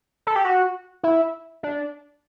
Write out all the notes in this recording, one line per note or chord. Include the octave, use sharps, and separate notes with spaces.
A4
G4
F#4
E4
D4